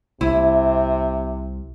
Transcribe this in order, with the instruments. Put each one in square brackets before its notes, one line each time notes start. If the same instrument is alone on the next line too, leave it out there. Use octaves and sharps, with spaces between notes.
[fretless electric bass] C2 [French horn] C3 [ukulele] E4